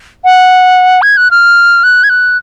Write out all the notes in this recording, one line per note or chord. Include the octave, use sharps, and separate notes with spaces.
F#5
G#6
F#6
F6
F#6
G#6
F#6